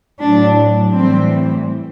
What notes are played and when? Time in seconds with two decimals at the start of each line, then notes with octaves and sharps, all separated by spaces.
0.22 A2 F#3 D4
0.94 A2 E3 G3 C4